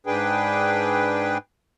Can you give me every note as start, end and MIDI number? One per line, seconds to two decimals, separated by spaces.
0.07 1.38 44
0.07 1.38 62
0.07 1.38 68
0.07 1.38 71
0.07 1.38 79